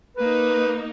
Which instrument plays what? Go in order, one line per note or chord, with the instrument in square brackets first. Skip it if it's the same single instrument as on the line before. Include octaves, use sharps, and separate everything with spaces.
[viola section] A#3 D#4 [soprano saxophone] B4